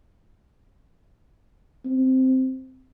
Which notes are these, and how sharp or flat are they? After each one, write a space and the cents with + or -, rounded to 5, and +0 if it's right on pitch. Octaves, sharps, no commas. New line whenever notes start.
C4 -5